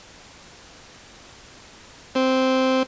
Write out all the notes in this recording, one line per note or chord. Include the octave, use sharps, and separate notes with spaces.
C4